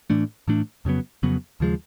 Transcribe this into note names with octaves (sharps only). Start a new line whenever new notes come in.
A2 E3 A3 D4
A2 E3 A3 D4
F2 C#3 F#3 B3
F2 C#3 F#3 B3
D#2 C#3 F3 G#3